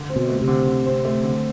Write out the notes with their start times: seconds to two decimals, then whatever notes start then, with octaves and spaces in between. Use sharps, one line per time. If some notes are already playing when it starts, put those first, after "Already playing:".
Already playing: D3
0.10 C4
0.16 B2
0.29 A3
0.41 C3
0.48 D3
0.67 D3
0.86 C4
1.05 A3
1.24 D3